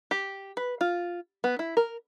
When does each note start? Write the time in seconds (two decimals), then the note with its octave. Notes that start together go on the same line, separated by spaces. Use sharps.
0.11 G4
0.57 B4
0.81 F4
1.44 B3
1.59 E4
1.77 A#4